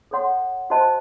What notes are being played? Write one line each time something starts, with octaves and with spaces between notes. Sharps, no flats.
A4 C#5 F#5 C6
F#4 C5 D#5 A5